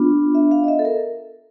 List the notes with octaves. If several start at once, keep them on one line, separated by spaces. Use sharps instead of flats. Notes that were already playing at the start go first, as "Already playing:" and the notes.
Already playing: B3 D4 F4
E5
F5
D#5
E5
A4
A#4